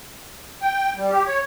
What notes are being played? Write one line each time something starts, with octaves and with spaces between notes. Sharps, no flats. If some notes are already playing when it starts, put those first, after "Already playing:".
G5
G3
G4
C#5